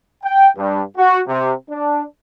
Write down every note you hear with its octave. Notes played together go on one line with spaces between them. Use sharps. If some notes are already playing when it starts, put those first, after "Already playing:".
G5
G2
F#4
C3
D4